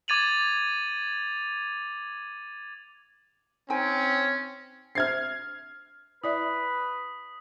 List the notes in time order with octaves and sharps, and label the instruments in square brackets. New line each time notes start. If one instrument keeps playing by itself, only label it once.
[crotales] D6 G#6 A6 D#7 F7 F#7
[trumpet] C4 [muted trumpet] C#4 [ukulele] D#4 G5 G#5
[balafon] D4 C5 E5 [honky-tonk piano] F6 G#6 C7
[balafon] E4 D5 E5 [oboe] B4 [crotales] D#6